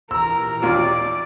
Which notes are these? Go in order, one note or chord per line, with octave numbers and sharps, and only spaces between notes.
A#2 E3 G4 A#4 A#5 E6
D#2 F4 D5